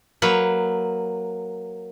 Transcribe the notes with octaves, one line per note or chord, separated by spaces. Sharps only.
F#3 A#3 B4